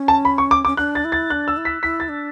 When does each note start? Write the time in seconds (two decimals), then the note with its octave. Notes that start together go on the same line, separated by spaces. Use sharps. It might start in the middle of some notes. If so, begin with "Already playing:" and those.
Already playing: C#4
0.08 A5
0.25 B5
0.38 C#6
0.51 D6
0.65 C#4 D6
0.77 D4 F#6
0.95 A6
1.04 E4
1.12 A6
1.30 D4 F#6
1.48 E6
1.57 E4
1.65 B6
1.82 E4 B6
2.00 A6
2.09 D4